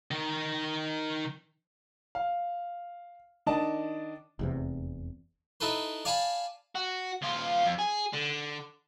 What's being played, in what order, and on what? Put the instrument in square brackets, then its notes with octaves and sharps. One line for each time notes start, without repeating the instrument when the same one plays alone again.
[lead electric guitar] D#3 D#5
[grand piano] F5
D#3 D4 D#5 A5
[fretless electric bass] F1 E2 C3
[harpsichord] D#4 E4 A4 B4 C5
D5 F5 G#5 A5 B5
[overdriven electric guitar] F#4
D#2 F4
F2
G#4
D3